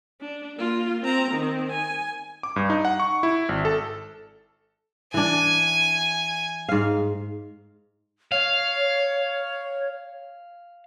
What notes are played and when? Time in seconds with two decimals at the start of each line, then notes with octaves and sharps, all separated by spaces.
0.21 D4
0.57 A#3 F4
1.02 C4 A#5
1.32 D#3 C4
1.72 G#5
2.43 D6
2.56 G2
2.70 D#4
2.85 F#5
3.00 C#6
3.23 E4
3.49 G#1
3.65 A4
5.14 E3 D4 G#5
6.69 G#2 F5
8.32 C#5 F5